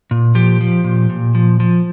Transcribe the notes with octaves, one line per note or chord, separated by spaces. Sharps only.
A#2
F3 G4
F3
A#2
A#2
F3
F3